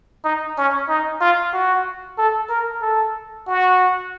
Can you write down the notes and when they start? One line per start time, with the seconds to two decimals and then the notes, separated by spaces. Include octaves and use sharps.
0.24 D#4
0.58 C#4
0.89 D#4
1.21 F4
1.53 F#4
2.18 A4
2.49 A#4
2.82 A4
3.47 F#4